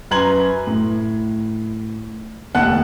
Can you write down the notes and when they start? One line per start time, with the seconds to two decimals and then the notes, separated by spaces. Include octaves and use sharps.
0.11 F#2 B4 A#5 C6 G#6 F#7
0.67 A2
2.55 F1 D#2 F#5 A5 F#6